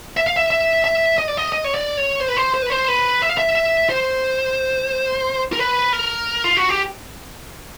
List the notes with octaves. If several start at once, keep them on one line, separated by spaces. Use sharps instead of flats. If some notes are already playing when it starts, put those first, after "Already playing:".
E5
F5
E5
E5
E5
D#5
D5
D#5
D#5
C#5
D5
C#5
C5
B4
C5
C5
B4
C5
B4
E5
F5
E5
E5
C5
A#4
B4
A#4
F4
F#4
G4